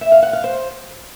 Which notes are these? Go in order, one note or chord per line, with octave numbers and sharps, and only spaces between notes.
E5
F5
F#5
F5
C5